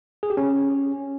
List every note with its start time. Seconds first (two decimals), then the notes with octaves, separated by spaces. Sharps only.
0.23 G#4
0.30 G4
0.37 C#4